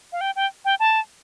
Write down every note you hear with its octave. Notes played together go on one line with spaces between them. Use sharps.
F5
G5
G5
G5
A5